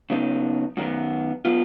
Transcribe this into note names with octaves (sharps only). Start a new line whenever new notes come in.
C#3 F#3 B3 D#4
F#2 D#3 F#3 B3
F#3 B3 F4